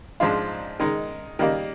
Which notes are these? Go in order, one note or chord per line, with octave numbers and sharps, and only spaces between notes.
G#2 F3 G#3 D4 F4
D#3 G#3 D#4
D#3 G3 A#3